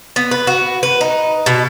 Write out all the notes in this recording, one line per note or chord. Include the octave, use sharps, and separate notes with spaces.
B3
B4
F#4
B4
D#4
B2